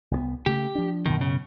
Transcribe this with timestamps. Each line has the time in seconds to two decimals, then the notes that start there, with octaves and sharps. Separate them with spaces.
0.11 C2 G3 B3
0.46 C#3 A3 G4
0.75 F3 D4
1.06 F#2 B2 D#3
1.21 C#3